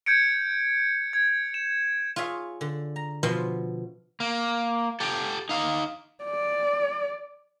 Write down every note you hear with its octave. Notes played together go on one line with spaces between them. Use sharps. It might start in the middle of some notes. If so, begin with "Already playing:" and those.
G6 G#6 C#7 D7
G#6
E7
F4 G#4 C#5 E5 F5
D3
A#5
B2 F3 B3 E5 C6
A#3
G4 A4
D#4 F5
D5